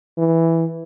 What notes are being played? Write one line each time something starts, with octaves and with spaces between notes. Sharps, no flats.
E3